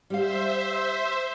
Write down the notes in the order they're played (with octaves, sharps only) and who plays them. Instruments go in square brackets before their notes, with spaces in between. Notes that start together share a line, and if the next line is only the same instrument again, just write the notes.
[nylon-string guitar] G3 G4 F5 [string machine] C5 E5